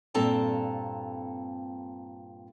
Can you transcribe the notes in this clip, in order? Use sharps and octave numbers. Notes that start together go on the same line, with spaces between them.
G2 A#2 C4 A4 A5 A#5